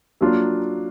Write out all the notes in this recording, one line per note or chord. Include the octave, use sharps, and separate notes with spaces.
F#3 A#3 D4 F4